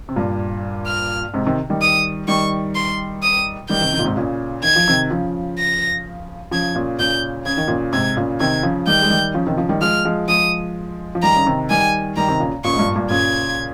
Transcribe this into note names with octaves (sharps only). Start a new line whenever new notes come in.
C3
G2 A#2
F6
G#2 C3
C3 D#3
D#3 G3
D#6
D#3 G3 C#6
C6
D#6
D#3 G3 G6
C3 D#3
C3 D#3
A#2
G#2 C3
A#2 C#3
D#3 G#6
F3
C3 D#3
C#3 F3
A#6
C#3 F3 G#6
A#2 C#3
A#2 C#3 G6
C#3 G#6
D#3
A#2 C#3
G#2 C3 G#6
A#2 C#3
C3 D#3 G#6
C#3 F3
D#3 G3 G6
G#3
D#3 G3
C#3 F3
C3 D#3
C#3 F3
D#3 G3
F3 G#3 F6
F3 G#3
F3 G#3 D#6
F3
D#3 G3 A#5
C#3
C3 D#3
D#3 G3 G#5
D#3 G3 A#5
C3 D#3
A#2 C#3
A#2 C#3 C#6
G#2
G2 A#2
G2 A#2
A#2 C#3 G#6